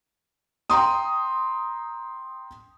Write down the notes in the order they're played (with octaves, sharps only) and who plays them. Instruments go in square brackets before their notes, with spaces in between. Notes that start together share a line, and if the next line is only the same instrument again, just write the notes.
[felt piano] G5 A#5 C6 D#6